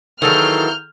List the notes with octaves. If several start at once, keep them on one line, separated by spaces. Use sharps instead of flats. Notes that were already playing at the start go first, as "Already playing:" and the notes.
D#3 E3 F#3 A#3 G#4 A4 F6 G6